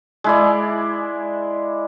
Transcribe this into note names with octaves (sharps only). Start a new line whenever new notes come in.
G#3 E4 D5